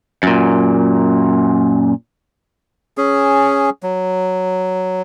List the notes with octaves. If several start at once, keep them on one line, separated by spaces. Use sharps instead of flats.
F#2 A#2
C#4 G#4
F#3